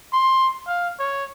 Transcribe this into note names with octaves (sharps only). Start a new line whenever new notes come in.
C6
F5
C#5